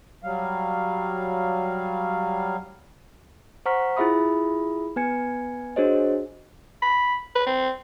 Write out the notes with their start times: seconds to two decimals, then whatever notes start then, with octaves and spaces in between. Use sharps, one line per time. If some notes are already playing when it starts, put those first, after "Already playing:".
0.24 F#3 G3 F5
3.66 C5 F#5 A#5 C#6 F6 B6
3.97 E4 F4 G#4 E5 B5 D#6
4.96 B3 B4 G#5 G#6 C#7
5.76 D4 F#4 G#4 C5 C#5 D#5
6.82 B5
7.35 B4
7.46 C4